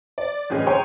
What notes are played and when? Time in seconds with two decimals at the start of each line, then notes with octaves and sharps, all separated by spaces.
0.18 D5
0.50 G1 A2 E3 C#4 G#4 D#5
0.67 G#4 C#5 G5 G#5 A#5 C6